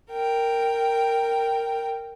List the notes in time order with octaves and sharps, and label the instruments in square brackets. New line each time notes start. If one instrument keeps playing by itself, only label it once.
[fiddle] A#4 G5